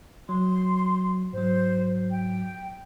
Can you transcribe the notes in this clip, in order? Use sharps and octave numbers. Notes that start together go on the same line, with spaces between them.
F#3 C6
G#2 F#3 C5
G5